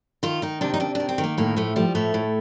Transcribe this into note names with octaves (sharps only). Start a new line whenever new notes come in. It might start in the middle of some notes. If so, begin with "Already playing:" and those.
D#3 F4
D#3 D#4
C3 D4
D#4
C3 D4
D#3 D4
C4
D#3
A#3
A2 A#3
F3 A3
F3 G3
A2 A3
A2